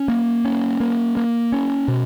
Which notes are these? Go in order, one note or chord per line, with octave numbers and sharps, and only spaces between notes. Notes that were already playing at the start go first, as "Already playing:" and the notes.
Already playing: C#4
A#3
C#4
A#3
A#3
C#4
B2